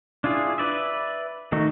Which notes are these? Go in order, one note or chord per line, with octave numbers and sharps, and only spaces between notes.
D4 E4 F4 G#4
B4 D5 E5
D#3 A3 D#4 F#4